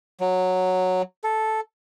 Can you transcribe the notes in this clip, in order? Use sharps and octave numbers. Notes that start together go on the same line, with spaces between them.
F#3
A4